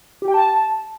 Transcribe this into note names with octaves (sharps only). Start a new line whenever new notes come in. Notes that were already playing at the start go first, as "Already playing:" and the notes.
G4
G5
A5